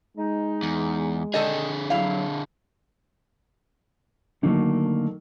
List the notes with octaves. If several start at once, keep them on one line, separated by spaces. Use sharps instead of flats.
G#3 D#4
E2
D3 D#3 G#4 A4 D#5
F#3 E4 F5
D3 D#3 F#3 A3 A#3